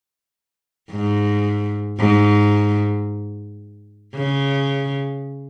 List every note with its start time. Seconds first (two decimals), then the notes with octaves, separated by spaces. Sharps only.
0.91 G#2
1.99 G#2
4.15 C#3